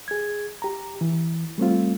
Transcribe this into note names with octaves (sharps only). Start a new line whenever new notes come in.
G#4 G#6
G4 A#5
E3
G3 A3 C4 F4